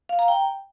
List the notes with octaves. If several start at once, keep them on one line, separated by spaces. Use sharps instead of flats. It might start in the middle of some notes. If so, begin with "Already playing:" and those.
F5
A#5
G5